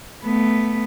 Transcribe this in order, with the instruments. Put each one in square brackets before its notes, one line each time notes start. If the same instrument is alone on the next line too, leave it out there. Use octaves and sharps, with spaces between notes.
[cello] A3 B3